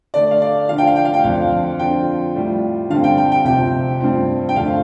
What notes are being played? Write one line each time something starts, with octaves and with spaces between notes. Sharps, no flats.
D3 A3 D4 D5
F5
D5
D3 F3 D4 F4 F5
G5
F5
G5
F5
G5
F2 D3 F3 D4 F5
D3 F3 C4 F4 G5
A2 G3 F4
G2 D3 G3 C4 F5
G5
G5
G5
F2 C3 F3 G5
G2 F3 C4
G5
F2 D3 F3 A3 F4 F5